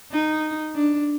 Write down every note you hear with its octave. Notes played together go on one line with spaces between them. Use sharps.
D#4
D4